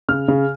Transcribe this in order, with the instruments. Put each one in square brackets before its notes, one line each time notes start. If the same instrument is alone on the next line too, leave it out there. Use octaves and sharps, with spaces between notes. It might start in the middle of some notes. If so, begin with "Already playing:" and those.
[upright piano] C#3 F6
C#3